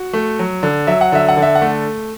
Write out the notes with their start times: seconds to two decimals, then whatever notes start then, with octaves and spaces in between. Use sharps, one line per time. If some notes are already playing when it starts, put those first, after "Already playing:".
Already playing: F#4
0.13 A3
0.39 F#3
0.63 D3
0.87 F#3 E5
1.01 F#5
1.12 D3 E5
1.28 F#5
1.37 D3
1.42 E5
1.55 F#5
1.62 A3